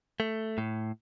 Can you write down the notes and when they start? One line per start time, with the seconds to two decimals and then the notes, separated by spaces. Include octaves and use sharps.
0.20 A3
0.58 A2